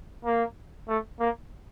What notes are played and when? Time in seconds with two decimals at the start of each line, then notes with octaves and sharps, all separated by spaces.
0.25 A#3
0.88 A3
1.20 A#3